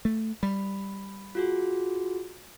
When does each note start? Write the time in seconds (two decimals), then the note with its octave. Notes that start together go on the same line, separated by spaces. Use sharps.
0.05 A3
0.43 G3 B5
1.35 F4 F#4 G#4